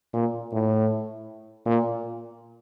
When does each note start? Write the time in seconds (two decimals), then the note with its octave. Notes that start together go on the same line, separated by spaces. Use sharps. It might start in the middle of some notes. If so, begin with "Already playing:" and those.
0.13 A#2
0.52 A2
1.66 A#2